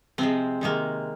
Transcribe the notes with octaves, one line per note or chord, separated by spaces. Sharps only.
C3 F3 G#3 C4
C3 D#3 G#3 A#3